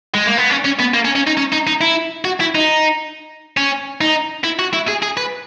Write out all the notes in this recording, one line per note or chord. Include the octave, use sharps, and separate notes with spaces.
G#3
A#3
B3
C#4
C#4
B3
A#3
C#4
C#4
D#4
C#4
D#4
D#4
E4
F#4
E4
D#4
C#4
D#4
E4
F#4
E4
G#4
G#4
B4